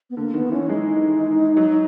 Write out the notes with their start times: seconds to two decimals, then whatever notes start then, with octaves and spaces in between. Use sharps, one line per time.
0.10 B3
0.17 D3 A#3
0.34 D#3 B3
0.52 E3 C#4
0.69 G#3 D#4
1.57 F#3